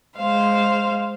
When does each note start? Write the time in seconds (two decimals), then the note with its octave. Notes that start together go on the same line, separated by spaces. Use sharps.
0.16 G#3 C5 F5